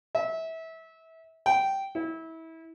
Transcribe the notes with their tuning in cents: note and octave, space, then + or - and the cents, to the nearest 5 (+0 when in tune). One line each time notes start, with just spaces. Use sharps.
E5 -25
G5 -10
E4 -25